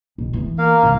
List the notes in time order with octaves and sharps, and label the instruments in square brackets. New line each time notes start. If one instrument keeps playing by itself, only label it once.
[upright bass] B1
E3 B3
[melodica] A#3 A#4 F5
[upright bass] C2